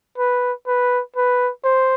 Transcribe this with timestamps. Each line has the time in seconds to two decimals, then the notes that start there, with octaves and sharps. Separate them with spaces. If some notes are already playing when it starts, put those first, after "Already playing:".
0.18 B4
0.67 B4
1.16 B4
1.64 C5